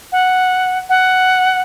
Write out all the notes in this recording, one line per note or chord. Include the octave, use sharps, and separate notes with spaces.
F#5
F#5